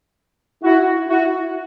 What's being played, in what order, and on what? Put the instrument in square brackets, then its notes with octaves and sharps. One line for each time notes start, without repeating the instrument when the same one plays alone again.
[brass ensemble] E4 F#4
E4 F#4